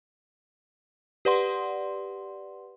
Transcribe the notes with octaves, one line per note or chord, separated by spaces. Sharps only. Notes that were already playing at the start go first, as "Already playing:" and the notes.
G4 B4 D5 F#5 C6